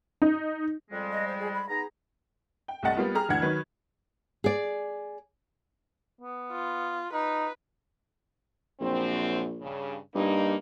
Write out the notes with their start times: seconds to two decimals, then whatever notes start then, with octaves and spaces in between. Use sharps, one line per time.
0.22 D#4
0.91 F2 G3 G#3
1.12 D#5
1.27 C5
1.39 G#4
1.54 B5
1.69 B3 D#4 G#4 A#5
2.68 G5
2.83 C2 A3 D#5 F#5 A6
2.97 G3 A#3 B3 F4
3.14 G4 G#4 A#5 F6
3.29 D2 E3 D4 F#5 G#6
3.42 D#3 F#3 B4
4.44 G#4 D5
6.21 B3
6.52 F4
7.13 D#4 B4
8.80 A#1 F#2 C4
9.61 G2 C#3
10.15 G2 A#3 D#4